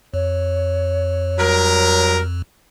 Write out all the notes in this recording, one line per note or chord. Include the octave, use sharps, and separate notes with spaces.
F2 C#5
F#3 G3 A#4